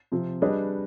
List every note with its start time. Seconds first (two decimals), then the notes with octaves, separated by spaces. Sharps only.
0.12 C3 F3 C4
0.42 G3 D4 G#4 B4 D#5